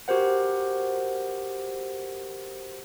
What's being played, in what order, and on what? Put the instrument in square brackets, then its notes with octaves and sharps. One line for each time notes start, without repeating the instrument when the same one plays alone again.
[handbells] F#4 G4 A#4 C5 F#5